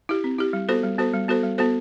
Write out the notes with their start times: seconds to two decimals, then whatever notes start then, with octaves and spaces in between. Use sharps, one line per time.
0.09 E4 G4
0.24 C4
0.39 E4 G4
0.53 G3
0.69 B3 F#4 A4 C5
0.83 G3
0.98 B3 F#4 A4 C5
1.13 G3
1.28 B3 F#4 A4 C5
1.43 G3
1.58 B3 F#4 A4 C5